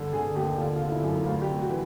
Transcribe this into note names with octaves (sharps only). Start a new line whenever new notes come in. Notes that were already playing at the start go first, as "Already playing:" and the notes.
Already playing: G2 D3
D3 G#4
D#2 G4
D3 F4
F4
D3
E4
F#2
E4
D2 F4
G4
C3
F#4
E3